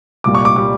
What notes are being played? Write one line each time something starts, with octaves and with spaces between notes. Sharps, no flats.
C2 A#2 G3 D6
C#6
D6
A#2 G3 D6